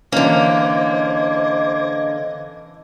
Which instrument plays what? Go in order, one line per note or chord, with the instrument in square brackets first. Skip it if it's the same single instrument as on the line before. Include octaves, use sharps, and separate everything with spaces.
[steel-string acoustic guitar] D3 A#3 [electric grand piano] E3 C#4 [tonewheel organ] C5 D6 G#6 [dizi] D#5